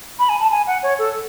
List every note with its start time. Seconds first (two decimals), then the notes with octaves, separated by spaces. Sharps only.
0.19 B5
0.29 G#5
0.40 A5
0.51 G#5
0.67 F#5
0.83 C#5
0.99 A4